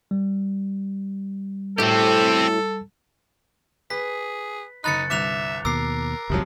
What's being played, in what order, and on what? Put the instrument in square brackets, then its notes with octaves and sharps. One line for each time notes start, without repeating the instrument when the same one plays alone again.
[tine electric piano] G3
[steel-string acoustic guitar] F#2 A2 [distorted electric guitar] C4 G4 [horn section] A4
[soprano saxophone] G#4 [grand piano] B4 [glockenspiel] B6
[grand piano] F#1 B5 [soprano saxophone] D#4 [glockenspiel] F#6 A6 C#7
[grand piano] G1 C2 [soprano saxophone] E5 [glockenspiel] D6 F#6 F7
[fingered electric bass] D#2 B2 [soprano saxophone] A#4 [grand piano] D6 [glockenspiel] E6 C7
[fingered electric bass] F#1 C#2 [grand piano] C3 F3 F#3